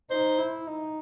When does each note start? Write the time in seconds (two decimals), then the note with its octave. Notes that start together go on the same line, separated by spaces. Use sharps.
0.11 D#4 C5
0.39 E4
0.67 D#4